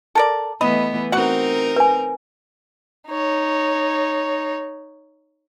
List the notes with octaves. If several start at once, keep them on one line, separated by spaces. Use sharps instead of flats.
A4 A#4 D5
E3 A3 B3 D#5 B5
C4 D#4 F#4 A#4 F#5
B4 G#5
D#4 C#5